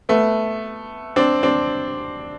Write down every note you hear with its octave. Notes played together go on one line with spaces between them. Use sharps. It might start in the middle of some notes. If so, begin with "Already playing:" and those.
A3 B3
C4 D4
C4 D4